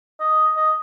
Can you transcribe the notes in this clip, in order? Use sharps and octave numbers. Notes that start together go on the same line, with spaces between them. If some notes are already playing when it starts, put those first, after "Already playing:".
D#5
D#5